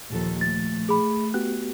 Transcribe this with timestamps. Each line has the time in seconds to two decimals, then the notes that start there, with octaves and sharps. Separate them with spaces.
0.10 D#2 A#2 F3 A4
0.41 A3 A6
0.89 G#4 B5
1.34 B3 F#4 G4 F#6